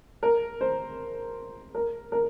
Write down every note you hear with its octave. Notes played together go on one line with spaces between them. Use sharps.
A#4
C5
A#4
A#4